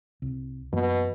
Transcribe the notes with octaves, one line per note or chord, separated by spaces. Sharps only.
C2
F#2 B2 E3 A#3